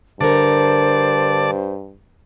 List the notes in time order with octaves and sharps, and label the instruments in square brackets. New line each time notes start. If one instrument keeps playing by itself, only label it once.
[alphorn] G2 [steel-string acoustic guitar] D3 A#4 [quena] C5 [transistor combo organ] D5 A5